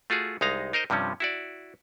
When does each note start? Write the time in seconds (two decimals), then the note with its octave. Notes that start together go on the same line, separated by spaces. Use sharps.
0.10 A3 F4 F#4 G#4
0.41 C2 G#3 D#4 F5 A#5
0.73 D#4 A#4 C5 D#5
0.90 G2 C3 F3 G3 C#4
1.20 E4 F#4 D5